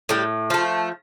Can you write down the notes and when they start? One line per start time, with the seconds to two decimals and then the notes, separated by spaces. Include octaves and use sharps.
0.09 A2 G3 G4
0.50 F3 A3 F4